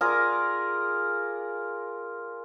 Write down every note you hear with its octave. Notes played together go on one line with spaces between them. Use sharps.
F4 G#4 A#4 D5